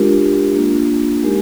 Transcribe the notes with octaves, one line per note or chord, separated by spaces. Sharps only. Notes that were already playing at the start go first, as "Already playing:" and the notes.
Already playing: G#3 D4 F4 G4 A#4
A#3 D4 F4
G#3 D#4 G4 A#4